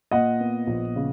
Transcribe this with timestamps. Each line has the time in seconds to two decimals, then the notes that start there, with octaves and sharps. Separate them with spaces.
0.11 A#2 D#5 F#5
0.40 B3
0.67 A#1
0.96 C#3